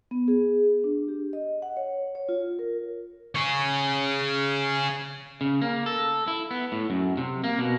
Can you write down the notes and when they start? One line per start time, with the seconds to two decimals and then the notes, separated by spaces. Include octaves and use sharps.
0.11 B3
0.28 G#4
0.84 D4
1.08 G4
1.33 D#5
1.62 F#5
1.77 C#5
2.15 C#5
2.29 F4
2.59 A#4
3.35 G#4 C#5
5.41 C#3
5.62 A#3
5.86 A4
6.28 E4
6.51 B3
6.72 A2
6.90 F#2
7.17 C3
7.44 A#3
7.59 B2